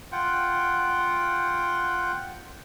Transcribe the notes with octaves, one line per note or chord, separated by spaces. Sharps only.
F4 F#5 G5